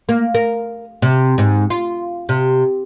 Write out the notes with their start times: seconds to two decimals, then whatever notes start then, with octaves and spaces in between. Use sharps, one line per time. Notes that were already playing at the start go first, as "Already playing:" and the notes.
0.09 A#3
0.34 A#4
1.02 C3
1.38 G#2
1.70 F4
2.29 C3